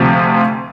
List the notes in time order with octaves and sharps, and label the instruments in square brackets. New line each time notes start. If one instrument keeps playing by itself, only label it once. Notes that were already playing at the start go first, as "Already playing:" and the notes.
Already playing: [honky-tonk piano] D2 C3 F3